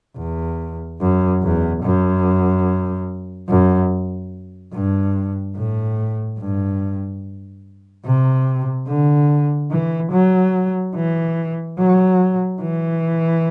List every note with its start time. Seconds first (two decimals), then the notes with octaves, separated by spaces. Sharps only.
0.17 E2
1.00 F#2
1.43 E2
1.83 F#2
3.49 F#2
4.73 G2
5.56 A2
6.39 G2
8.05 C3
8.88 D3
9.71 E3
10.12 F#3
10.95 E3
11.79 F#3
12.61 E3